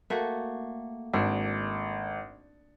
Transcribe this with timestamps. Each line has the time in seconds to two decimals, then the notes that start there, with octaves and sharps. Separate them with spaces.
0.10 A3 A#3 F#4
1.14 G#1 D4